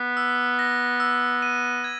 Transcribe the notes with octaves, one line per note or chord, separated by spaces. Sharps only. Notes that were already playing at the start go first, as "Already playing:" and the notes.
Already playing: B3 B6
E6
A#6
E6
D#7
G#6